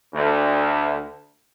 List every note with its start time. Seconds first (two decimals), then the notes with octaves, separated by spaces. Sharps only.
0.14 D2